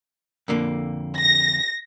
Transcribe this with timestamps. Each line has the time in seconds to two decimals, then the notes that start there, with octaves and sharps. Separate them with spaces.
0.48 F2 D3 A#3
1.18 A#6